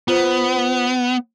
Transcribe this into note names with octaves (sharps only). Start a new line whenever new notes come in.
B3 F4 C5